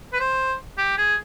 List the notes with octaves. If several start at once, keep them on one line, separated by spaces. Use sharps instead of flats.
B4
C5
G4
G#4